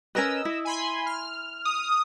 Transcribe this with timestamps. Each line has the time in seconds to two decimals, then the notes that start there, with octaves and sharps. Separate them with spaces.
0.15 C#4 A#4 B4 D#5 E6
0.45 E4
0.65 G#5 B5 C6
1.06 F6
1.65 D#6